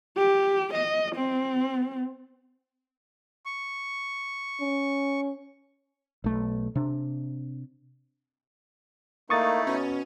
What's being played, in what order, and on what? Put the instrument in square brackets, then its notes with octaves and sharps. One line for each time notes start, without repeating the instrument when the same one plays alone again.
[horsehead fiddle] G4
D#5
C4
[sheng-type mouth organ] C#6
[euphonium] C#4
[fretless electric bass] B1 A3
C3 D4
[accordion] A3 D#4 E4 [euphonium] A#3 [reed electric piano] C#6 D#6 A6
[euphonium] B2 [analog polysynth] C#4